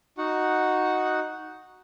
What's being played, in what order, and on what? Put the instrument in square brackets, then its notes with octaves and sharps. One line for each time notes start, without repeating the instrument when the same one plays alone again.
[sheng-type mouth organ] D#4 F#4 F#5